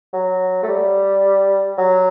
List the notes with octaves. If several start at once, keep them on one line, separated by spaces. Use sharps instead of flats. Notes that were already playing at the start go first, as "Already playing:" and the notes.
F#3
A3
G3
F#3